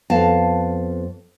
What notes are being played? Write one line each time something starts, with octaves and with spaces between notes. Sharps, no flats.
F2 B3 F5 A5